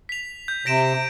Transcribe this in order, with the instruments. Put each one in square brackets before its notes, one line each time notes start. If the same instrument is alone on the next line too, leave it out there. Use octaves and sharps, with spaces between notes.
[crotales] B6 F7
G6
[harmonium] C3 [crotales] A#6 D7 E7